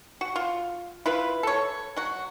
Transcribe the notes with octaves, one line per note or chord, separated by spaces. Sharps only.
F#4
F4
E4 F4 B4
A4 C#5
F#3 F#4